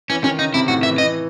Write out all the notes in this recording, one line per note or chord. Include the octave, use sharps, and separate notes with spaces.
E3 C#4
D#3 C#4
C#3 D#4
C3 E4
A2 F#4
E3 E5
E3 D#5